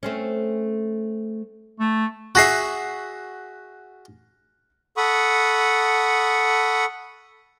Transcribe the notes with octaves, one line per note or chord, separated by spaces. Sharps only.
A3 C4 C#4
A3
F#4 G#4 E5 F#6 A#6 C7
A4 F#5 B5 C#6 D#6